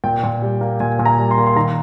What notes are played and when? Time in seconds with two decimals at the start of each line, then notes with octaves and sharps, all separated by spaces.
0.04 A#2 G5
0.23 A#2
0.42 G3
0.61 A#3
0.80 A#2 G#5
0.99 A#2
1.06 A#5
1.18 G3
1.31 C6
1.38 A#3
1.46 C6
1.56 D#3 A#5